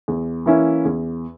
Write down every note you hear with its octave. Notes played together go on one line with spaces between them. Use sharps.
E2
E3 A#3 C#4 E4
E2